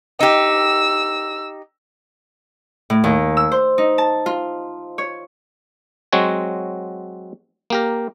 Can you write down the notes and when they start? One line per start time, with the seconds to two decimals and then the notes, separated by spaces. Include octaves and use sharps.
0.20 D#4 G4 E6
2.90 A2
3.04 D#2
3.37 E6
3.52 C5
3.78 D#4
3.98 A5
4.26 F4
4.98 C#5
6.12 F#3 G#3 C4 F#4 C#5
7.70 A#3 G4 A#4